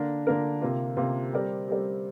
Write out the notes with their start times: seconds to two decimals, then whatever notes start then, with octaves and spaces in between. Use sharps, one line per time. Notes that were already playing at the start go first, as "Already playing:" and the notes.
Already playing: D3 A#3 D4 A#4
0.27 D3 A#3 D4 A#4
0.62 C3 A#3 F4
0.97 C3 A#3 F4
1.33 G3 C4 G4 A#4 D5
1.68 G3 C4 G4 A#4 D5